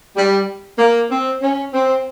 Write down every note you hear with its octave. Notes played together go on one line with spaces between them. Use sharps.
G3
A#3
C4
C#4
C4